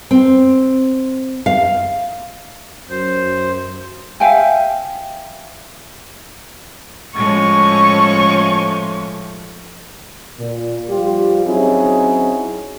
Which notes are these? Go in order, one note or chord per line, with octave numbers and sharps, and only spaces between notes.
C4
F5
F#2 C5
E5 F5 G5 G#5
A2 F3 G#3 C#4 C#6
A#2
F3 G3 F4 G4
F#3 C4 C#4 D#4 E4 G#4